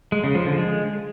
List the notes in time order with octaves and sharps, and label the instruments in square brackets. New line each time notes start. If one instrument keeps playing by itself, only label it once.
[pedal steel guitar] G#3
C#3
F3
D3
G#3